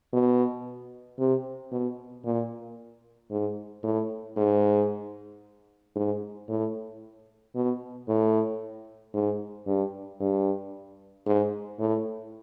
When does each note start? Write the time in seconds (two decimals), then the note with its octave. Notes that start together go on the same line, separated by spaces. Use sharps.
0.13 B2
1.19 C3
1.72 B2
2.25 A#2
3.31 G#2
3.83 A2
4.37 G#2
5.96 G#2
6.49 A2
7.55 B2
8.08 A2
9.14 G#2
9.67 G2
10.20 G2
11.26 G#2
11.79 A2